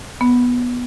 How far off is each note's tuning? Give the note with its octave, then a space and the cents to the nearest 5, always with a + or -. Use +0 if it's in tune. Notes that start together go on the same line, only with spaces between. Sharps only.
B3 -10